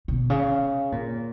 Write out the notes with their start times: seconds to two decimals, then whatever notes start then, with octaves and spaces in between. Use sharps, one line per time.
0.08 B2
0.30 C#3
0.92 A#2